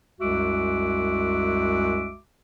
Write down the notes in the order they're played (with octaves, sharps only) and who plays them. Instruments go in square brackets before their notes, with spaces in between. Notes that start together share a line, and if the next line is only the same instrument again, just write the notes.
[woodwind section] C2 F#2 G#3 F#4 E5 D6